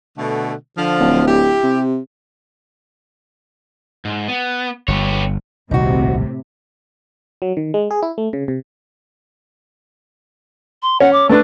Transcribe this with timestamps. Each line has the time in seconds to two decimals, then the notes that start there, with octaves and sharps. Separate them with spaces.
0.18 B2 D3 A3
0.77 D3 F3
1.00 D1
1.28 E4 G4
1.63 C3
4.05 G#2
4.28 B3
4.88 G1 B3 G4 C#5
5.71 D#1 C2 A2 C3 D#4 F#4
7.42 F#3
7.57 D#3
7.74 G#3
7.91 G#4
8.02 E4
8.18 A3
8.33 C#3
8.48 C3
10.82 C6
11.00 C#4 F#5
11.13 D6
11.29 A3 D4 B4